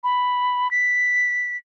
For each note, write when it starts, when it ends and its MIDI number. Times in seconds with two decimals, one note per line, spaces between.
0.04 0.70 83
0.71 1.57 95